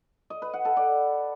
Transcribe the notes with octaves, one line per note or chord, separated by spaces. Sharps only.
D#5
B4
F#5
A4
D5